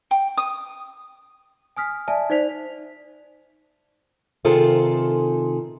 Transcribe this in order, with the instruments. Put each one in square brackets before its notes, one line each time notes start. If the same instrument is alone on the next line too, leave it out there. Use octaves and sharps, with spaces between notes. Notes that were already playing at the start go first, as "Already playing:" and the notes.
[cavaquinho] G5
D#6
[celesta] G#5 D#6 F6 B6
D5 E5 G#5 A5
D#4 C5 D5 B6 F7
[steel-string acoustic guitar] C3 D#3 F4 G#4 A4 C5